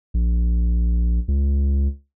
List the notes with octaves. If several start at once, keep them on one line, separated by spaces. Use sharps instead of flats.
A#1
C#2